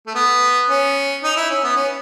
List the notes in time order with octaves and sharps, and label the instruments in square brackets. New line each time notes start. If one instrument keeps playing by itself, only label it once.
[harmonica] A3
B3
C#4
D#4
E4
C#4
B3
C#4